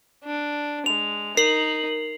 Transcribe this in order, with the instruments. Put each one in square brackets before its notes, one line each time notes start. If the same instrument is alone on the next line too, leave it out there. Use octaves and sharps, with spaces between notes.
[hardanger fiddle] D4
[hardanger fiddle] G#3 [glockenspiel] F7
[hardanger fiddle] D#4 [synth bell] A#4 F#7 [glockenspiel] C7